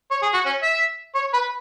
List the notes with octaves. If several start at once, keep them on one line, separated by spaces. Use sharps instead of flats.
C#5
G#4
F#4
C#4
E5
C#5
B4